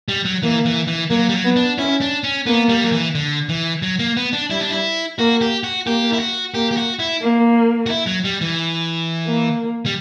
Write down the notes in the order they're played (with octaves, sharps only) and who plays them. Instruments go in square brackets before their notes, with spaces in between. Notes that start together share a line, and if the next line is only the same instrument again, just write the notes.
[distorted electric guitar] G3
F#3
[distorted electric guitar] E3 [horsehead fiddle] A#3
[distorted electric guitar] E3
E3
[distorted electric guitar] F#3 [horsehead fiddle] A#3
[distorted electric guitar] G3
F#3
[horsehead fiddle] B3
[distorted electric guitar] D4
[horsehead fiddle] C#4 [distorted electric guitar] E4
[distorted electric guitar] D4
C#4
[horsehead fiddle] A#3 [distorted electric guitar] B3
[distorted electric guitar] G3
F#3
E3
D3
E3
F#3
A#3
B3
D4
[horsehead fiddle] G3 [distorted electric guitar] E4
[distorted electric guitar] D4
E4
[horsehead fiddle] A#3 [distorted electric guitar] F#4
[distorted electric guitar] G4
F#4
[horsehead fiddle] A#3 [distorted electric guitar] G4
[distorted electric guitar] E4
F#4
[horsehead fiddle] A#3 [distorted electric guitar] G4
[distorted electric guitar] G4
F#4
E4
[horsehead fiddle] A#3
[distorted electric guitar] F#4
E4
F#3
G3
E3
[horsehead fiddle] A#3
[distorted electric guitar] G3